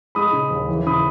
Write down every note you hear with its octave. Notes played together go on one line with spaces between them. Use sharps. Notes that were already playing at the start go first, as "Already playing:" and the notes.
G#3 B5 D#6
C#3
D#2
E3
C#3 B5 D#6